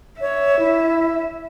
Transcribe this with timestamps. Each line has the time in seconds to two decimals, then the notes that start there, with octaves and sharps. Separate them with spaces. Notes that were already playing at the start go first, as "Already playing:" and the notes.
0.21 C#5 E5
0.59 E4